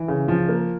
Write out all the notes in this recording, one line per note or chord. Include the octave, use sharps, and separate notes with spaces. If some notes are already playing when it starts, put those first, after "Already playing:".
Already playing: E3
C#3
F3
A#3